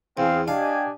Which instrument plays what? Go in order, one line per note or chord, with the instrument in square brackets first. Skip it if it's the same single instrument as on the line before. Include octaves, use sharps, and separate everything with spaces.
[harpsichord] E2 [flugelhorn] C4 [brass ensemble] G#4 F5
[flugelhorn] D4 [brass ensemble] G4 D#5 G#5 [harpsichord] F5